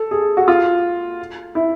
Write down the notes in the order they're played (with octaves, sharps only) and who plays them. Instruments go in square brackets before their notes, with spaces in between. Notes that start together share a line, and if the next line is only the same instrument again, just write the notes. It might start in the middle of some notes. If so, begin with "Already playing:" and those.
Already playing: [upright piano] A4
G#4
F#4
F4
E4